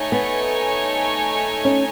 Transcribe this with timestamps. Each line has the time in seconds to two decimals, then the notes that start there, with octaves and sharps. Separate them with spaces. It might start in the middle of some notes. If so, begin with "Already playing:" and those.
Already playing: A3 D#4 A4 C#5 G#5
0.12 B3
1.65 C#4